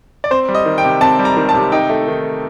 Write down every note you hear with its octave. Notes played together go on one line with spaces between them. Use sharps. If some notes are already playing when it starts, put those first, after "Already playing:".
D5
C4 C5
G3
D#5
D#3
G5
C3
C4 A5
G3
A#5
D#3
A5
C3
D#4 G5
A3
D#3